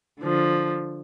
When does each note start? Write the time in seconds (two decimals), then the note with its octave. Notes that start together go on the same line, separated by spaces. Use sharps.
0.20 D3 F3